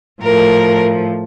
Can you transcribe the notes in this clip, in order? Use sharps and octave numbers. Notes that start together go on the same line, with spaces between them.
A2 F3 A#4